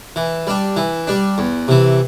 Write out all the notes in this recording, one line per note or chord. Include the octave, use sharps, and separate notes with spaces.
E3
G3 D4
E3
G3 D4
E2
C3 E3